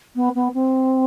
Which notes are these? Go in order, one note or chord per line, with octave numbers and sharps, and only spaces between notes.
B3
B3
C4